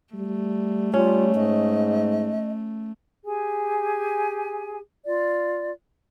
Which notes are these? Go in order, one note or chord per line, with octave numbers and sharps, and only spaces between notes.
G3 A3
G3 C#4 F4
G#2 D#5
G4 G#4 G#5
F4 D5